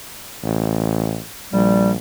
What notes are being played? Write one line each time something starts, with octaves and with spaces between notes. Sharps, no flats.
A1
A#1 G3